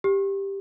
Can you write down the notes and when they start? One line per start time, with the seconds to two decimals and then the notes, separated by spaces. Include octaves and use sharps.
0.04 G4